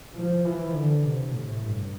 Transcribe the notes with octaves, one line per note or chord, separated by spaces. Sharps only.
F3
E3
D3
C3
A2
G2